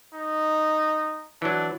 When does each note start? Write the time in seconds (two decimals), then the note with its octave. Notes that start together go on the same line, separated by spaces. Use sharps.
0.14 D#4
1.42 E3 F#3 D4